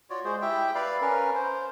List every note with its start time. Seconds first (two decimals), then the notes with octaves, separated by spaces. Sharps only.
0.10 F4 F#4 C#5 D5
0.24 G#3 G#4 C5
0.42 E4 G4 E5 G5
0.75 B4 D5 F5 B5
1.02 C#4 A#4 B4
1.35 C5